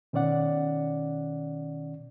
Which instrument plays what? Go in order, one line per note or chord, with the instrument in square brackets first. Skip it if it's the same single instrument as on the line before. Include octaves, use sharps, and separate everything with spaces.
[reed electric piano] B2 D#3 C#4 D5 F#5